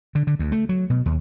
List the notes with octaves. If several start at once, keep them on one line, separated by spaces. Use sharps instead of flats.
D3
D3
D2
A3
F#3
B2
D#2